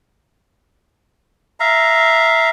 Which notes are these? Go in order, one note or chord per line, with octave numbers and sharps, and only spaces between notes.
E5 F5 A#5